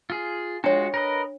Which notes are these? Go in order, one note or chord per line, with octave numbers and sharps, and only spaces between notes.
F4 G#4
G#3 D4 F4 F#4 C#5
A#4 B4 D#5